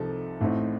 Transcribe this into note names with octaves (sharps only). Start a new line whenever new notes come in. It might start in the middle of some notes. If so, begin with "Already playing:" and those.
Already playing: C2 C3 F3 C4 D#4 A4
A1 A2 A3 C4 D#4